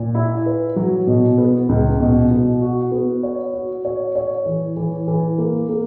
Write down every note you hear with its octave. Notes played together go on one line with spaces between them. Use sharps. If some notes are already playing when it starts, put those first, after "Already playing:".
Already playing: A#2
E4
B4
F#3
B2
B3
C#2
B2
B2
F#4
B3
C#5
F#4
C#5
C#5
E3
E3
E3
A#3
A#3